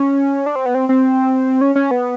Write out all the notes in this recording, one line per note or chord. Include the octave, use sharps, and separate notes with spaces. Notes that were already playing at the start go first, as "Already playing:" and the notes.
Already playing: C#4
D4
C4
B3
C4
C4
C#4
C#4
B3